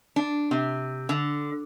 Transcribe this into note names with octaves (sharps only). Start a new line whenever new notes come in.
D4
C3
D3